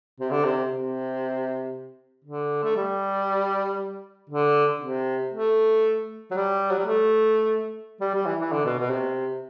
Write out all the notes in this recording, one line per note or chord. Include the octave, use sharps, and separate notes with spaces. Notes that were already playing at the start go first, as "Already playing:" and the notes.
C3
D3
C3
C3
D3
A3
G3
D3
C3
A3
F#3
G3
F#3
G3
A3
G3
G3
E3
E3
D3
B2
B2
C3